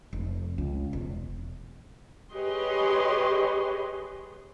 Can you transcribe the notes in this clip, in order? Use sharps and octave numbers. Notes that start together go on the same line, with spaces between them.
F1
C#2
E1
G4 G#4 B4 C#5 D#5 C6